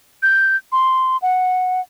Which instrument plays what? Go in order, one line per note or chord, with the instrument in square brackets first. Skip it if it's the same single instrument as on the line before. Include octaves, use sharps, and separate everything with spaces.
[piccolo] G6
C6
F#5